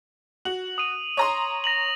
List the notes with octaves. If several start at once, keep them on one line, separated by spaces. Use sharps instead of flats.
F#4 F#7
D#6 D#7
C#5 A#5 C6
A#6 F7 F#7